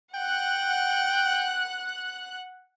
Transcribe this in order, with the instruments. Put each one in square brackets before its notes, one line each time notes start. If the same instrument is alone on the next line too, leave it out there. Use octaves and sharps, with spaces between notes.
[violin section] F#5 F#6 [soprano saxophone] G5